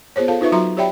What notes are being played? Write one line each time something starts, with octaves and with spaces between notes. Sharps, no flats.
B3 F4 G#4 C5 C#5
F4 A4 F5 A5
D#4 F4 B4 E5 C#6
F#3 F4 F#4 E5 A#5 C6
G4 C#5 D5 E5 G5 B5